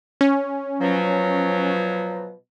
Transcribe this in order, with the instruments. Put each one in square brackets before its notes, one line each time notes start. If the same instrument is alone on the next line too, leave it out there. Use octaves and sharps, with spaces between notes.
[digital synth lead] C#4
[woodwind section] B2 F3 F#3